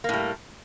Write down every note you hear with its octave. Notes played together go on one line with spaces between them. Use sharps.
A2 G3 A#3